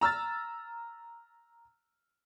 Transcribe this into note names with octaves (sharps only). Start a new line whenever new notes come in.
A#5 E6 F6 A6